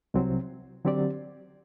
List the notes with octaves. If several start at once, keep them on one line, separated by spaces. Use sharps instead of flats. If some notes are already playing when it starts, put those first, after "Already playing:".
C2 C3 F#3 C4
D3 F#3 C4 G4 D5